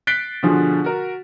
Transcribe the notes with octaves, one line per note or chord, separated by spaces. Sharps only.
F#6 A6 B6 C7 D7 G7
B2 D3 F3 G#4
F#4 A#4